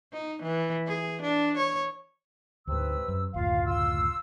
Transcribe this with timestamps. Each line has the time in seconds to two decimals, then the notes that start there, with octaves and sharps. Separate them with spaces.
0.13 D#4
0.43 E3
0.87 G#4
1.22 D4
1.57 C#5
2.67 D2 G#2 C3 B4 E6
3.08 F#2
3.34 F#1 D2 A2 F4 F5
3.66 F4 C6 E6